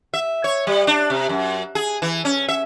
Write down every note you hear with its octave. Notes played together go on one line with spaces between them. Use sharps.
E5
C#5
G3
D4
C3
F#2
G#4
E3
C#4
E5